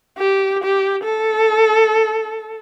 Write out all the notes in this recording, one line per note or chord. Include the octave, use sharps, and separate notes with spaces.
G4
G4
A4